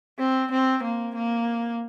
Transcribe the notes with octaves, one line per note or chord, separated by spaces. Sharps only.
C4
C4
A#3
A#3